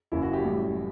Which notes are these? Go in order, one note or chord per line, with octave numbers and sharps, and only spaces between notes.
F#1 F#2 E3 E4
F#4
G4
A1 A2 G3